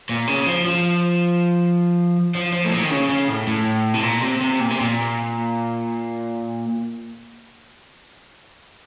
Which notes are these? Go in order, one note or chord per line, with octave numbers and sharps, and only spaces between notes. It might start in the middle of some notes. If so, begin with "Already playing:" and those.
A#2
C#3
F3
F3
F3
F3
A2
A#2
D#3
C#3
C#3
A2
A2
C3
A#2
C3
C3
A#2
C3
A#2